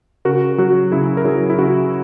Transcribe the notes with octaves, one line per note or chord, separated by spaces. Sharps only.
C#3 F#4 A#4
F#3 F#4
C#3 E4 G#4
A#4
F#3 E4 G#4
E4
C#3 F#4